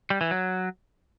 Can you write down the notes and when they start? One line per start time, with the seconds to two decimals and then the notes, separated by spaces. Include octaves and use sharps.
0.10 G3
0.21 E3
0.31 F#3